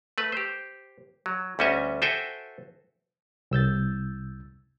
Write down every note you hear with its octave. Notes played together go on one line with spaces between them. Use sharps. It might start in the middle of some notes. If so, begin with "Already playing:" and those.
A3 B4
G4 C5
F#3
D2 G3 C#4 F#4 D#5 E5
F#4 A4 C5 E5 G5 G#5
C2 E6 G6 A6